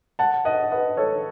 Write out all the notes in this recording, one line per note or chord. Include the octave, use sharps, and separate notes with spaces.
F#5 A5
D#5 F#5
B4 D#5
A4 C#5